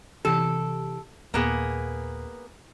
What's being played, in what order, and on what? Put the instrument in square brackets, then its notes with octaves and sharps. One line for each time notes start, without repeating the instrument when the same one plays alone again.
[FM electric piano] C3 E3 G4 [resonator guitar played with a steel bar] A4
[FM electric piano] D#2 A#2 [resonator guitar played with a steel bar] A#3 B3 G#4